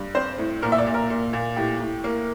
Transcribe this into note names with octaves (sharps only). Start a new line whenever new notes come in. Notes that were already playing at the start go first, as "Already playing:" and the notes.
Already playing: G2
C4 C5
A2
A#2 A#4
E5
D5
A#2
A#4
A#2
A#2
A2 G4
A2
A#3